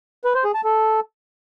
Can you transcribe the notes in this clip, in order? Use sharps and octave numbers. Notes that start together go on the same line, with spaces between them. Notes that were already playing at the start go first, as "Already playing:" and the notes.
B4
C5
G#4
A5
A4